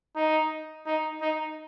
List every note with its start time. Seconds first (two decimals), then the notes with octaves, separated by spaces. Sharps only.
0.16 D#4
0.86 D#4
1.21 D#4